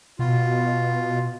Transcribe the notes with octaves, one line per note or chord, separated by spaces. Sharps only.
B2 F4